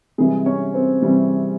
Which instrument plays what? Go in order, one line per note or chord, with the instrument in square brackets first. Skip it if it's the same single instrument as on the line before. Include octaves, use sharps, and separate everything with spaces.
[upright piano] C3 E3 G3 G#3 G#4
C#4 C#5
C4 C5
C3 E3 G3